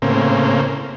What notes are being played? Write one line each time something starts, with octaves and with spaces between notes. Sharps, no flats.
A2 C#3 A#3 C4